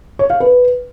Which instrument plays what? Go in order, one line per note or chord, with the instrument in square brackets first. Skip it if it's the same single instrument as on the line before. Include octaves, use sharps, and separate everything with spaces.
[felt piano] C#5
F5
B4